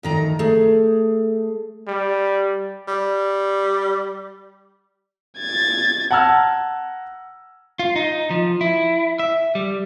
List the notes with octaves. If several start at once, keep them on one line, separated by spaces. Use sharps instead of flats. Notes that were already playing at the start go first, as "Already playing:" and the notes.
D2 D#3 A#5
A3 G#4
G3
G3
G#6 A6
F#5 A5 A#5 E6 F6 G#6
F4
D#4
F3
E4
E5
G3